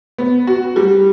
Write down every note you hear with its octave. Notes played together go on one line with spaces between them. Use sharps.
B3
F#4
G3